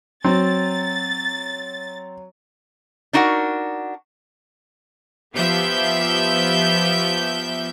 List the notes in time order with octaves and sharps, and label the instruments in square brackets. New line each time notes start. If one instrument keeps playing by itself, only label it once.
[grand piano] F#3 [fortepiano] C4 [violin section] A6
[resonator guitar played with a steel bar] D4 D#4 F#4 A#4 F#5
[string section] F3 B3 G4 E5 G6